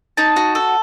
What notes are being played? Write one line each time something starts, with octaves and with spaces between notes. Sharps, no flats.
D#4 A5
F#4
A4